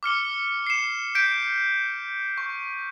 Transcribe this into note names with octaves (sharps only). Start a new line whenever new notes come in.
D6 F6 C#7 G7
C7 C#7 E7
G6 B6 D7
C#6